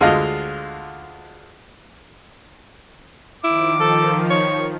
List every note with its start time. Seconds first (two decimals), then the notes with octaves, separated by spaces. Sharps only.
0.01 D2 D3 G#3 F4 D#5 F5
3.44 D#3 F3 E4 D6
3.80 A4
4.30 C#5